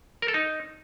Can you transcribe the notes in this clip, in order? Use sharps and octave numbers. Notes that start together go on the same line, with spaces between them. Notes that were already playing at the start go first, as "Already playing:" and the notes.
A#4
A4
D#4